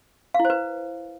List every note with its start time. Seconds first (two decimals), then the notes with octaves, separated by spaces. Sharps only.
0.34 F5
0.40 E4
0.45 C5
0.50 B4